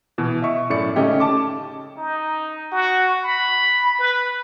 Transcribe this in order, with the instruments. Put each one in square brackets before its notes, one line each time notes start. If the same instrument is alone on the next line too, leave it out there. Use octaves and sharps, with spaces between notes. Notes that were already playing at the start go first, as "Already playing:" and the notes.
[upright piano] B2 E3
D#5 E5 C#6
F#2 A2 D5 C#7
C#3 A3 C#4 D#4 G4
A5 D6
[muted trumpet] D#4
F#4
B5
B4